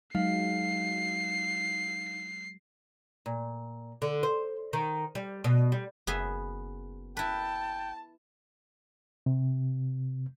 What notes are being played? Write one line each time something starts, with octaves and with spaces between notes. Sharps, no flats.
F#3 G#3 D#4 F5 C7
A#2
D3
C5
D#3
G3
B2
G3
F#1 B3 G#4 E5
E4 B4 G5 A5
C3